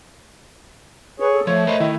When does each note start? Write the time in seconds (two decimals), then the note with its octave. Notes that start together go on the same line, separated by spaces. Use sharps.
1.20 G#4 B4 C#5
1.32 A4
1.47 F3 A3 C#5
1.67 A#4 C5 D#5
1.80 D#3 E4